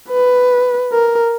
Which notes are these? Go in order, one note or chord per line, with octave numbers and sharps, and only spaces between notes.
B4
A#4